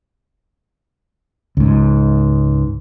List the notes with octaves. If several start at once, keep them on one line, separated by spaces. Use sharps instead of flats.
C#2 G#2